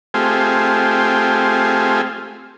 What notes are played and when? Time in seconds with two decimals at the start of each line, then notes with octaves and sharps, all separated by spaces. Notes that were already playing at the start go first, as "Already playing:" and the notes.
0.14 A3 C4 F4 G4 G#4